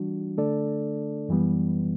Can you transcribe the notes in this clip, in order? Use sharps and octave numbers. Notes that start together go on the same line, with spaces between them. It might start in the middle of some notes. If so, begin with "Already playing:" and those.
Already playing: E3 G3 D4 F#4
D3 A3 D4 A4 D5
F#2 E3 G3 B3